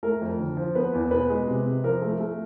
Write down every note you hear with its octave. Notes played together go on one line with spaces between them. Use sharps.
A3 A#4
F2
D3
F3
B3 B4
E2
B2 B4
G#3
C3
C3
F3 A#4
A3
A3